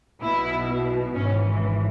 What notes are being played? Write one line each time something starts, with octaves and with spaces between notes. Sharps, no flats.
B1 B2 E4
G#1 G#2 E3 C#4